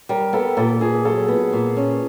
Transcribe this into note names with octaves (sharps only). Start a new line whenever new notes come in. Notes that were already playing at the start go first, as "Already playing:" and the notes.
G3 A#4
B3 A4
A#2 A4
A#2 G#4
F#3 A4
B3
A#2
C#4